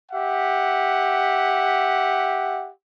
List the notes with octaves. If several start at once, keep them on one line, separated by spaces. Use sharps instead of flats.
G4 E5 F#5